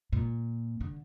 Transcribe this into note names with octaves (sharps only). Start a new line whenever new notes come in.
A#2
D3